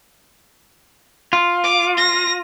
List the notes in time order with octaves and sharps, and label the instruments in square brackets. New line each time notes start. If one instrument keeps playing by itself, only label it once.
[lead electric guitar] F4
[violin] D6
A#6